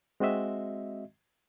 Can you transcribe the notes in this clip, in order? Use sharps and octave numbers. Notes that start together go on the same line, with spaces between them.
G#3 C4 F#4 D#5 E5